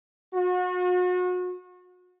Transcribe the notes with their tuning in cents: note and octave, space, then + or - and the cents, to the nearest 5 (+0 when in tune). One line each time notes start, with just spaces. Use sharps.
F#4 -35